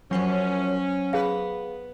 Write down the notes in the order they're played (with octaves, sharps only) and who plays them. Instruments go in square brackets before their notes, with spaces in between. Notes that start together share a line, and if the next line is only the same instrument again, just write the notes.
[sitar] F#2 F3 [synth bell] F#3 C5 F#5 [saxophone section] C#4
[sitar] B3 B4 [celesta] G#4 F5